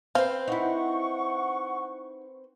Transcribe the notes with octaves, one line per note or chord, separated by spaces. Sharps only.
C4 B4 C5 F5
D#4 E4 F#5 C#6